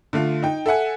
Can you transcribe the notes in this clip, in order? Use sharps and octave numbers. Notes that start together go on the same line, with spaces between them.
D3 A3 F4
D#4 G5
A4 E5 F#5 G#5